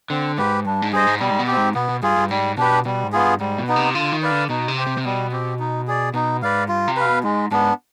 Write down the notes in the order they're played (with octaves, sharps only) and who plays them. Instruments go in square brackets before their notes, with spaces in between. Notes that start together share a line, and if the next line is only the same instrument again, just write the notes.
[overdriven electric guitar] D3 [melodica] C4
[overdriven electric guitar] G#2 [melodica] G4 B4
[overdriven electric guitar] G2 [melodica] D4
[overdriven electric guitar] G#2
[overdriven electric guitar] G2 [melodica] G#4 C5 D#5
[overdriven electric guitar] G#2
[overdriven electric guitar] B2 [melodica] G3
[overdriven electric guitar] G#2
B2
[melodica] C4 G4
[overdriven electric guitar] G#2
[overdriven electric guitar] B2 [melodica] B3
[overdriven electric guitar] B2
[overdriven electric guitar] G2 [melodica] F4 G#4
[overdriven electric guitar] G2
[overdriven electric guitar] G#2 [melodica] G3
[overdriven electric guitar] B2 [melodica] D4 G4 B4
[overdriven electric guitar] B2 [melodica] G3
[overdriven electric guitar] G#2
[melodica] B3 F4 G#4
[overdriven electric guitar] G2
[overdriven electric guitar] G#2 [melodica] G3
[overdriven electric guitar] B2
[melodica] B3 D#4
[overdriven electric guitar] C3
[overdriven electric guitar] D3 [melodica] F4
[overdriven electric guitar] D#3
[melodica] B4 D5 F5
[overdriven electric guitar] D3
[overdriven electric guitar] B2 [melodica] D#4
[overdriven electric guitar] C3
[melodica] G4 C5
[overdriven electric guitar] C3
C3
[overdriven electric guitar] B2 [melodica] G3
[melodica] C4 G4
D#4
G#4 D5
[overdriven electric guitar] B2 [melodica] D#4
[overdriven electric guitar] G#2 [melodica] B4 D5 F5
[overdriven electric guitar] G2 [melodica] F4
[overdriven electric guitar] C3
[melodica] B4 F5
[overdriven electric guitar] B2
[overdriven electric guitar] G#2 [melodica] G#3
[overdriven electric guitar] G#2 [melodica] B3 D4